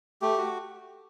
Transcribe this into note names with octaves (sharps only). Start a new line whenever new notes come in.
A3 G4
F#4